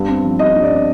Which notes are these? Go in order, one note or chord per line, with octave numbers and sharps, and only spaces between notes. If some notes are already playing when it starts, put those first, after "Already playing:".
Already playing: G2 B3
C4
F3
G2 D#5
G2
D5
C4